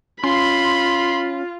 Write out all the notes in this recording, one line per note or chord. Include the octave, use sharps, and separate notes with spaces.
C#4 F4 B5 C6